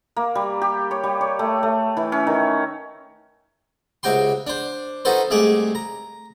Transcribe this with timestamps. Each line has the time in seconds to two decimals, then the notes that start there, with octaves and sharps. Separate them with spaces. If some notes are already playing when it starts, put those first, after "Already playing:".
0.16 A#3
0.35 G3
0.62 G4
0.91 C#5
1.04 G3
1.21 C#5
1.39 A3
1.63 A3
1.97 E3
2.12 C#4
2.27 D#3
4.03 C#2 C3 F#4 G5 C6
4.47 D4 C5
5.05 D#4 F4 F#4 A4 B4 C5
5.31 C2 G#3 A3 G#4 D6
5.75 A#5